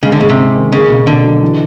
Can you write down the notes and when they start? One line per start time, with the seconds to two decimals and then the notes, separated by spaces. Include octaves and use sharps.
0.03 C#3 G#3
0.12 D3
0.21 G#2 C#3
0.30 C3
0.38 C#4
0.55 D#3
0.72 C#3 A#3
0.89 B2
1.07 B2 D3
1.24 F#3
1.42 E3